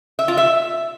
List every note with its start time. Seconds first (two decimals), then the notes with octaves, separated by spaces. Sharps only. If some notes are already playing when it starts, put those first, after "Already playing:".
0.19 E5
0.28 F4
0.37 E5